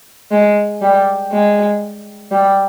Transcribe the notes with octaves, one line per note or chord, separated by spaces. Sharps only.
G#3
G3
G#3
G3